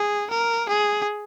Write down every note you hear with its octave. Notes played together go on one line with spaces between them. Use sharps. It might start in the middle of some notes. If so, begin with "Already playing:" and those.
Already playing: G#4
A#4
G#4